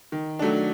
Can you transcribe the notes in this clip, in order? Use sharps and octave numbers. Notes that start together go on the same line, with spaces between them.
D#3
F#3 A3 D4